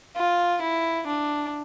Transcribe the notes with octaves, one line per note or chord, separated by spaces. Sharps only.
F4
E4
D4